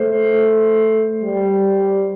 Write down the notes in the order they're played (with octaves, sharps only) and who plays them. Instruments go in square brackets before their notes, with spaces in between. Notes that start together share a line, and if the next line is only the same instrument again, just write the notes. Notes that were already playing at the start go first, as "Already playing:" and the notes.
Already playing: [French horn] A3 [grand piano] C5
[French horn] G3